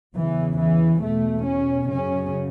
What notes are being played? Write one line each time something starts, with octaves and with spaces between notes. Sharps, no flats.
E2 C#3 E3
E3
E2 B2 A3
C#4
F#2 C#3 C#4